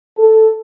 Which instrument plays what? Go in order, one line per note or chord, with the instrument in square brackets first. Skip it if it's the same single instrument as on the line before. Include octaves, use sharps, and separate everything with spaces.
[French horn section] A4